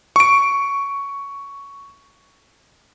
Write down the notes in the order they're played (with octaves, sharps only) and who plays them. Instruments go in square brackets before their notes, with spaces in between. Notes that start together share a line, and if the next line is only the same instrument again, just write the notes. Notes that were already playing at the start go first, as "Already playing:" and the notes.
[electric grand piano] C#6 D7